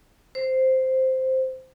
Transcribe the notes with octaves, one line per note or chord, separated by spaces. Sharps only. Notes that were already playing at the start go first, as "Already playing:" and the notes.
C5